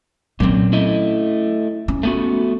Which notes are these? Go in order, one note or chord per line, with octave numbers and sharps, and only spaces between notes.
A#2 F#3 A#3 C4 C#4
A3 E4 D#5
C#4
A3 B3 F#4